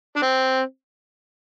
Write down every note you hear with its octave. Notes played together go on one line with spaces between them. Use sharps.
D4
C4